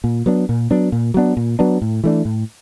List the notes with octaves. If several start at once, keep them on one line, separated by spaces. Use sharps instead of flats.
A#2
F#3 B3 D4
A#2
F#3 B3 D4
A#2
F#3 B3 D4
A#2
F#3 B3 D4
A2
E3 A3 D4
A2